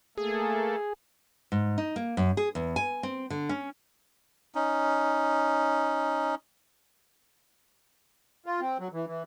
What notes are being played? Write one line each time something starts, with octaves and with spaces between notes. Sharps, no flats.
A3 A#3 G#4 A4
G#2
D#4
A#3
F#2
G#4
E2
G#5
C4
D3
C#4
C#4 D#4
F4
C4
F#3
E3
E3